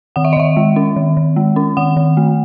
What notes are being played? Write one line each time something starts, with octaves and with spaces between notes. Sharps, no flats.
D#3 F#5
E5
D#5
D#3 E5
G#3
C#4
D#3
D#3
G#3
C#4
D#3 F#5
D#3
A3